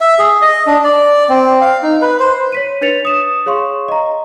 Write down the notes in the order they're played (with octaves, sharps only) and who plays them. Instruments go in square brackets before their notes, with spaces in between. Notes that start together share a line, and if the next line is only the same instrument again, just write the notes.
[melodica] E5
G#4
D#5
D4
D5
C4
F5
D#4
B4
C5
[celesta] C#5 B6 D#7
D4 B4 C#5 A6 C#7 F7
D#6 E7
G#4 C#5 F5 C6 C#6
D#5 A#5